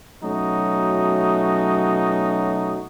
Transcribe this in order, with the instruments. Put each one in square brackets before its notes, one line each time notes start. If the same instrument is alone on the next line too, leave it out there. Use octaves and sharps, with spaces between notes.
[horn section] B2 F#3 A3 C#4 D#4 F#4